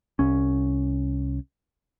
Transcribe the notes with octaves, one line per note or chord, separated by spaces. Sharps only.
C2 C#4